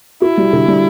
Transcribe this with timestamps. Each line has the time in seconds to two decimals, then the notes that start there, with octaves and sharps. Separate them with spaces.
0.22 E4 F#4
0.38 G3
0.53 D3
0.68 G3